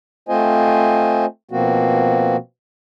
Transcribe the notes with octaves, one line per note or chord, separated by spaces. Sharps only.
A3 C4 F4 C5 D#5 G#5
B2 F3 A#3 C4 F#4